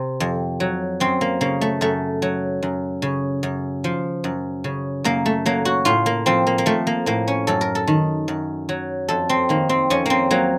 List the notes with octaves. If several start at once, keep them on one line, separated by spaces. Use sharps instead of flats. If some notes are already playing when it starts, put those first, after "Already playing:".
Already playing: C3 C4
F2
F#3
F#2 C4
A#3
C#3 A#3
A3
F#2 A3
F#3
F#2
C#3
F#2
F3
F#2
C#3
F#2 A#3
A3
F#3 A#3
F#4
A2 F4
A#3
F3 C4
A#3
A#3
F3 A3
A#3
A2 A#3
C#4
F#2 A4
A#4
A4
D#3
F#2
F#3
F2 A4
C4
D#3 A#3
C4
F2 C#4
A#3 C4
F#3 A#3